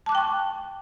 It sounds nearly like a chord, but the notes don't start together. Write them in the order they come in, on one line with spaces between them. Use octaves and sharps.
A5 D6 F#6 G5 C#6